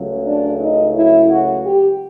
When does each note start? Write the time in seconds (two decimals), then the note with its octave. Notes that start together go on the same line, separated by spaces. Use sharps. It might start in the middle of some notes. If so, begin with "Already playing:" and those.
Already playing: C#2 C#3 F#3 A3
0.27 D4
0.61 D#4
0.96 E4
1.30 F#4
1.65 G4